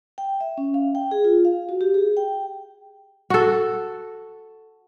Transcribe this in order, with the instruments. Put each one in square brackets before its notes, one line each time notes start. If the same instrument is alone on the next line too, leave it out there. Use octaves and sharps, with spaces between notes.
[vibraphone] G5
E5
C#4
F5
G5
G#4
F4
F5
F#4
G4
G#4
G5
[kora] F#4 A4